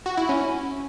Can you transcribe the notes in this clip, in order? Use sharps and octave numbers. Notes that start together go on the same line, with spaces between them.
F#4
E4
C#4